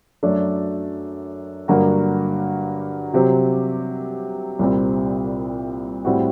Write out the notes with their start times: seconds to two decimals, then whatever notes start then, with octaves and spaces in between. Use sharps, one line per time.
0.23 F#2 F#3 A3 D4
1.68 G2 D3 F#3 A#3 F#4
3.13 C3 F#3 C4 G4 C5
4.59 C2 A#2 G3 C4
6.05 A2 G3 C4 F#4